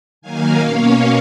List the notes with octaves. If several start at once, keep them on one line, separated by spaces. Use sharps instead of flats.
D#3 F#3 A#3 D#4 F5 G#5
B2 A#3 C#4 C#5 F5